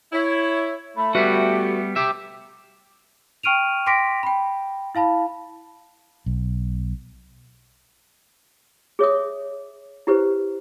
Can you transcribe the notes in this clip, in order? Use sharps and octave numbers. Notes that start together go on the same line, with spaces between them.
E4 C#5
A3 B5
G3 B3 F#4 G4 B4 E5
G4 E5 D6
G5 C#6 F6 D7 D#7 F7
G5 C6 D6 A#6 B6 D7
G5 B5
E4 F5 A5 B5
B1
G#4 C#5 E5 D#6
E4 G4 B4 C5